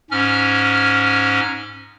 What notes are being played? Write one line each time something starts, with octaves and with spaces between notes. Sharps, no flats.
G#2 C#4 F6